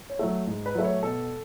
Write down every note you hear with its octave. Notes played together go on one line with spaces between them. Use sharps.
C#5
F#3 A3
G#2
B4
F#3 A3
C#5
B2 A4